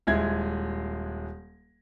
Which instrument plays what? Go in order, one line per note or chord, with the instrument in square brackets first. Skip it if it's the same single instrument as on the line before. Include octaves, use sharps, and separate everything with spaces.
[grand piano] D#1 G#3 E4 G#6